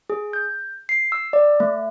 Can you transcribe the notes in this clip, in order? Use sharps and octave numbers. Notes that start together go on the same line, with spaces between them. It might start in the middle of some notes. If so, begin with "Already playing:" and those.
G#4
G6
C7
E6
D5
A3